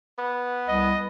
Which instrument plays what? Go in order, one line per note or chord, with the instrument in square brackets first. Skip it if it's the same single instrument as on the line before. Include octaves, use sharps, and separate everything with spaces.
[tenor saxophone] B3
[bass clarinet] C2 [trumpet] D#5